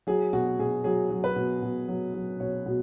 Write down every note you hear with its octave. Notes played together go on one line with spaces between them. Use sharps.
F#3 G#4
B2 F#4
B2 G#4
F#3 G#4
F#3
B4
B2
B2
F#3
F#3
B2 C#5
B2